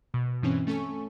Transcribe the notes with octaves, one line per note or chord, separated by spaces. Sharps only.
B2
G2 B2 E3 C4 C#4
A3 C#4 A4 G#5 C#6